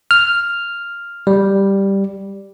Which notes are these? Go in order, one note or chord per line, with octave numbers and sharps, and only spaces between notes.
F6
G3